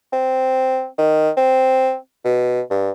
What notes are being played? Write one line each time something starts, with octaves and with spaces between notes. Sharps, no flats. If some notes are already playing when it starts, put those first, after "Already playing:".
C4
D#3
C4
B2
G2